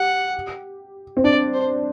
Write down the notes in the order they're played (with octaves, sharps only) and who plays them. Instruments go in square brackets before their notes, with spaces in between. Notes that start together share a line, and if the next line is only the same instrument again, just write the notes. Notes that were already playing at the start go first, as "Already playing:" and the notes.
Already playing: [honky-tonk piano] G4 [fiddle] F#5
[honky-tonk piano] C4
[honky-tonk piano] D4 [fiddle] D5
[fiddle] C5